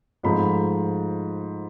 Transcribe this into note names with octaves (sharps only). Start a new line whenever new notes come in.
G#2 F3 A3 B5